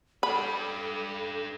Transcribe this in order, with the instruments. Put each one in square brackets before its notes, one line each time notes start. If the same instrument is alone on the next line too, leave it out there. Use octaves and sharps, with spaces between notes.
[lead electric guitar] D4 B4 [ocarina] A4 [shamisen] B5